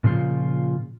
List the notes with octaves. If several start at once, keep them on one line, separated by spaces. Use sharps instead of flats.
A#2 C#3 F3 F4